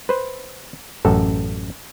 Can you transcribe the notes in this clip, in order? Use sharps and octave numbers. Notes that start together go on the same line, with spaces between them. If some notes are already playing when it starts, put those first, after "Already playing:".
B4 C5
A1 F#2 A4